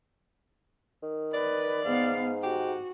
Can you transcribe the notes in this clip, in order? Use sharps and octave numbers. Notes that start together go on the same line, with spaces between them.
D#3
B4 D5
G#2 B3 F5
F#4 G4